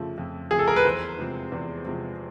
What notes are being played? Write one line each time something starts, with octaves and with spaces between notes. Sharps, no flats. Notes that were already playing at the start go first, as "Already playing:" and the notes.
Already playing: F2 C#3 F3 A3
F2
C#3 F3 A3 G#4
A4
A#4
B4
E2 C5
C3 F3 G#3 C4
E2
C3 F3 G#3 C4